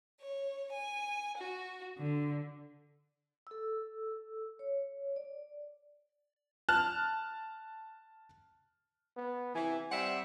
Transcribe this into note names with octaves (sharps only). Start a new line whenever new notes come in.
C#5
G#5
F#4
D3
A4 E6
C#5
D5
A5 F6 F#6
B3
C3 E3 G#5
G3 C4 E5 F#5